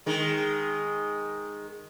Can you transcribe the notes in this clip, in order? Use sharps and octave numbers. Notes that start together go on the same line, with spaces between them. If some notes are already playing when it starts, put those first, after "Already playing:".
D#3 G#3